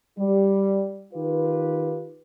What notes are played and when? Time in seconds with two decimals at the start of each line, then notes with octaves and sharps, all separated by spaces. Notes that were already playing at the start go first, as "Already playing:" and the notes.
0.18 G3
1.13 D#3 F4 G4 B4